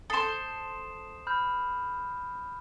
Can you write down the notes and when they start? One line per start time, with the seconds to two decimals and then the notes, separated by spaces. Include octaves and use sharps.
0.10 A4 C5 D#6 C7 E7
1.27 B5 F6 G6